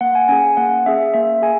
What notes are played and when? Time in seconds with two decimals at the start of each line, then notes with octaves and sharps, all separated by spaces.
0.01 A#3 F#5
0.15 G#5
0.28 C#4 G#4 G#5
0.57 A#3 F#5
0.86 C#4 G#4 E5
1.14 A#3 E5
1.42 G#4 G#5